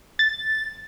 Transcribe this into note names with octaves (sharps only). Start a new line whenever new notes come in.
A6